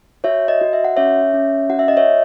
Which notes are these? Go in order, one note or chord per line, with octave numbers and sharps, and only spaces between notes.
F#4 C#5 E5
D#5
F#4
E5
F#5
C#4 C#5 E5
C#4
F#4 F#5
E5
D#5
C#5 E5
F#4